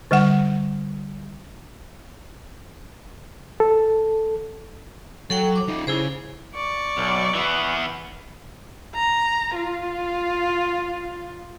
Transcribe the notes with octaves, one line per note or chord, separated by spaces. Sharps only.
D3 G3 F#5
A4
F#3 A4 F#5 G5
D6
D#4 F4
C#3 E4 G#4 C5
D5 C#6
B1
E3 B3
A#5
F4